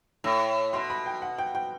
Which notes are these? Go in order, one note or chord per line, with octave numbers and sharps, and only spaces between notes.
A2 E6
B2 C6
B5
G5
F#5
G5
G5